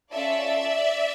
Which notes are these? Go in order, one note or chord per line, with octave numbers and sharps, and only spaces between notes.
C#4 F4 A4 D5 E5